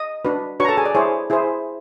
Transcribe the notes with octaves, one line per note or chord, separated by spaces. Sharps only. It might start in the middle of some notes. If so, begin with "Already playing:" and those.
Already playing: D#5 D#6
D4 F#4 B4
D4 F#4 B4 C#5 A#5 C#6
A4 A5
G#4 G#5
D5
E4 G#4 C5 C#5
E4 G#4 C5